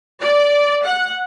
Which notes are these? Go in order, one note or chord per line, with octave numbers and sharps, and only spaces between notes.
D5
F#5